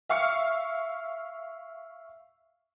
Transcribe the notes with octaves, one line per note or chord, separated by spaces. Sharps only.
E5 F5 C#6 F6 C#7